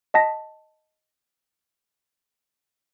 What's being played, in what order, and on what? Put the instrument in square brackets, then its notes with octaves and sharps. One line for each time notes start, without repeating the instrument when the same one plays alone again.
[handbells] D#5 F#5 A5 A#6 B6